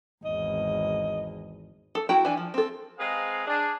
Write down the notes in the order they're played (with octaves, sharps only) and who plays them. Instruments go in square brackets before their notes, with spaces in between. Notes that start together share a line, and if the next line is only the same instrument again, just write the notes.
[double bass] G#1 E2 [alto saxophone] D#5
[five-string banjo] A4
E4 F#4 G5 A#5
E3 D4 G#5
F3
C4 A4
[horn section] G#3 C4 G#4 B4 F5 A#5
D4 G#4